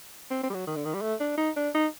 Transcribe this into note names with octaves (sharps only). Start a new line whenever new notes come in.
C4
C4
G3
F#3
D#3
D3
D#3
G3
A3
D4
D#4
D4
D#4